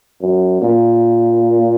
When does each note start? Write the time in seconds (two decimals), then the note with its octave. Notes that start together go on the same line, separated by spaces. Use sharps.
0.21 F#2
0.62 A#2